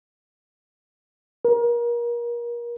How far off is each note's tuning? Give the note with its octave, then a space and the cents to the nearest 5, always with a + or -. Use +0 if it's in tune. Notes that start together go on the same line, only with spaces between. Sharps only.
A#4 +30